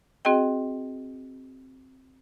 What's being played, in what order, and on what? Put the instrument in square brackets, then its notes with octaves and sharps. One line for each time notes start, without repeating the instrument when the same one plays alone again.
[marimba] C4 F#4 G#4 D#5 G5